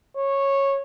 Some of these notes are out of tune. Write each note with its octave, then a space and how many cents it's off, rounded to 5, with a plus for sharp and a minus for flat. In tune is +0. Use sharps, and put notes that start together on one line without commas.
C#5 -10